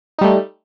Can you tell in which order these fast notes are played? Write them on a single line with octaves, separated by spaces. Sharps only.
D#4 G3 A3